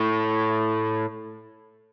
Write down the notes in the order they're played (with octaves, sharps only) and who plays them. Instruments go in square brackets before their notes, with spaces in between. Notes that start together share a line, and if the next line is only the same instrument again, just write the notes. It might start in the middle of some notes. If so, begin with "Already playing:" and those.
Already playing: [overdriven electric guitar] A2